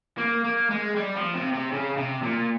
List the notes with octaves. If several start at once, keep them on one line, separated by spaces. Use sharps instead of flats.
A#3
A#3
G#3
G3
F3
C3
C3
C#3
C3
A#2